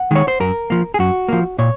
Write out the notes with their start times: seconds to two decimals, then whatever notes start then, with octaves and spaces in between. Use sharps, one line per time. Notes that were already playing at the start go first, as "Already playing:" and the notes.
Already playing: F#5
0.11 D#3 G#3 C#5
0.28 C5
0.40 F#2 A#4
0.70 F3 A#3
0.94 G#4
0.99 F#2 F#4
1.28 F3 A#3
1.58 A#2 C#5